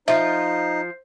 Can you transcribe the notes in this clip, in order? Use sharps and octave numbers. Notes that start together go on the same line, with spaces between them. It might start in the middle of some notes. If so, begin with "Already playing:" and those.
F3 D#4 F4 C5 E5